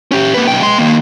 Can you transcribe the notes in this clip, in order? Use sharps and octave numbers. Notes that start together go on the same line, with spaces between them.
C#4 G4
A#3 B4
B1 G5
G#3 C6
D#3 A#3